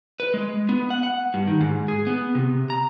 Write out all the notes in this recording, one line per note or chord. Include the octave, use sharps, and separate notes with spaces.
B4
G#3
B3
F#5
F#5
G2
D#3
G#2
G#4
B3
C3
A#5